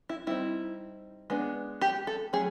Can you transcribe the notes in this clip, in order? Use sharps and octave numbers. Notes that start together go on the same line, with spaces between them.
E4
G3 C4 D#4 E4
G#3 B3 D4
G4
A4
F#3 A3 C#4 G#4